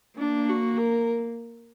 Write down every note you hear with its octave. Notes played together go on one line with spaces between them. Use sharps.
A#3 D4
F#4
A#4